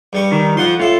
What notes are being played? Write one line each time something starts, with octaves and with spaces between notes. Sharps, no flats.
G2 G3 C#6
D#3
F2 F3 F#5 C6
A2 F4 A4